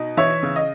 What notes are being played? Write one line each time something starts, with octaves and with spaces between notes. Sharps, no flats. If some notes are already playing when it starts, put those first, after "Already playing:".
Already playing: B2 D#4
E3 C#5 E5
C#3
D#5